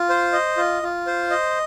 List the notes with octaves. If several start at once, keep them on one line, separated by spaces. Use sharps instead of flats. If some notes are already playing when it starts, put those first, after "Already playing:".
Already playing: F4
C5
D#5
F4
F4
C5
D#5